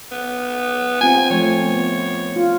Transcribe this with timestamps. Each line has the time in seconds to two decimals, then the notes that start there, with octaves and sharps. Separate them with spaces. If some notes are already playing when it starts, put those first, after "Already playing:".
0.12 B3
1.01 C4 F4 G#5
1.30 F3 A3 C#5
1.64 B3
2.36 F4